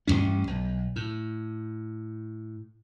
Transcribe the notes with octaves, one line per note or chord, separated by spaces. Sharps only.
A1 G2 A#2 C#4
B1
A2